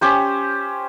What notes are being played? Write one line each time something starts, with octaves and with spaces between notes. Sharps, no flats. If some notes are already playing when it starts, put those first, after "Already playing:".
C#4 G4 C5